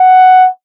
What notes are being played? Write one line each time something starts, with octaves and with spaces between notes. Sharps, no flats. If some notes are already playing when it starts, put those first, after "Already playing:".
Already playing: F#5